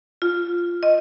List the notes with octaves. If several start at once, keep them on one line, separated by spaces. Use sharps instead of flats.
F4
D#5